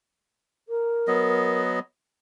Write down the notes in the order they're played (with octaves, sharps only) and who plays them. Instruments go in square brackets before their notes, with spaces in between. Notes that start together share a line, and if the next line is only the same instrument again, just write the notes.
[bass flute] A#4
[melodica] F#3 B3 D#5